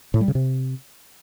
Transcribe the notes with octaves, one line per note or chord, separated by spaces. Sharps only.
A2
G3
C#3
C3